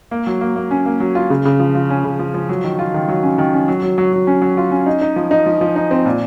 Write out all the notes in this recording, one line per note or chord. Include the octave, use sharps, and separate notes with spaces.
A#3
F#3
A#3
A#3
C#4
A#3
F#3
F4
C#3
C#3
F3
F3
C#4
C#3
F3
F3
F#3
D#3
F4
D#3
F#3
C#4
D#3
C#4
F#3
F#3
F#3
F#3
C#4
F#3
F4
C#4
D#4
D#4
F3
D#4
F3
F3
D#4
C4
A#2